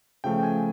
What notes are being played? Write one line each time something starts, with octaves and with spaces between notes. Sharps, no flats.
C#3 F3 A3 G5
G#5